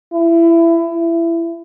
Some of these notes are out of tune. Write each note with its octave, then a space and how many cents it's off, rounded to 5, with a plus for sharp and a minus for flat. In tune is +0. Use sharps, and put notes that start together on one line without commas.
E4 +20
E4 +20